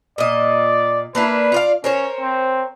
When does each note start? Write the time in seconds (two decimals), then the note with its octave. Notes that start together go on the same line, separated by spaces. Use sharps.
0.18 A#2 D5 D#5
1.15 A#3 D4 E4 B4
1.52 F4 D5 F5
1.84 C#4 A#4 C5 C#5
2.20 C4